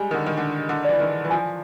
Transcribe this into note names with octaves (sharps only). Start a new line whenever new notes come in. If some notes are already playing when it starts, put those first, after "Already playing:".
Already playing: G3 G#3 G#5
D#3
D3
D#3
D3 D4
D3
E3 D5
D#3
E3
F3 G#5